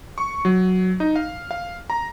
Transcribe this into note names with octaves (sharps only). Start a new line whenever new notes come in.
C#6
F#3
D#4
F5
F5
A#5